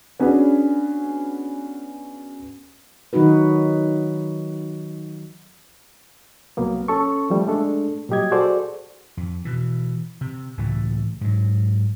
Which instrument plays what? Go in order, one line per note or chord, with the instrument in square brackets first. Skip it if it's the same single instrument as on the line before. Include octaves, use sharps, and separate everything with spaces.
[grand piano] B3 C#4 D4 F#4 G#4 B4
[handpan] D#3 F#3 D#4 F#4 B4
[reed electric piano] C2 F#3 A#3 B3
C#4 A4 A5 C#6
F3 G3 A3
G#3 A3 D4 A4
A#2 F#3 G3 G4 D#5 G#6
F#4 G#4 A4 C5 D5
[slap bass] F2
B2 E3
C3
C#2 A2 E3 A3
G#2 F#3